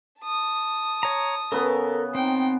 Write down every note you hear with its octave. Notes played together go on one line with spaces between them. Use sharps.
A5 D#6
C#5 A#5
C#3 B3 A4 A#4
C4 D#4 G5